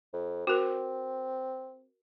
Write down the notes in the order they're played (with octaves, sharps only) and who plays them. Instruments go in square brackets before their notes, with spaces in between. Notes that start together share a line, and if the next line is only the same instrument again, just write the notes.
[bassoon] F2
[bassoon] C4 [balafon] F#4 A#4